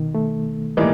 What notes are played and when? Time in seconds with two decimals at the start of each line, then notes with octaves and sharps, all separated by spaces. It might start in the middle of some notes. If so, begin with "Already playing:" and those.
Already playing: B2 D#3
0.15 A3
0.77 A2 E3 G3 A#3 D#4